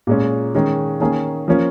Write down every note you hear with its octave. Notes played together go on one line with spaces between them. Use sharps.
A#2 G#3 C#4
D#3 G#3 C#4
D#3 A#3 C#4 G#4
F3 A#3 C#4